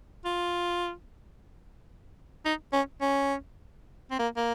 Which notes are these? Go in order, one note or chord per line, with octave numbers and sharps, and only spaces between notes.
F4
D#4
C#4
C#4
C4
A#3
A#3